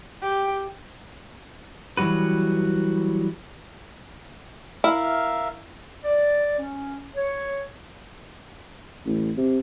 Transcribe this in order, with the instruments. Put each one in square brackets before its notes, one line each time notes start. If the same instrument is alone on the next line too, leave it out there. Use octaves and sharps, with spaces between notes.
[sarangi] G4
[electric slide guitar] E3 F#3 G3 F#4 B4
[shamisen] E4 [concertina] A#4 E5 F5
[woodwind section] D5
C#4
C#5
[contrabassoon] A1
C3